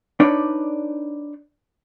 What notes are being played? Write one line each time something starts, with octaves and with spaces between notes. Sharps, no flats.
D4 D#4 B4 C#5 D5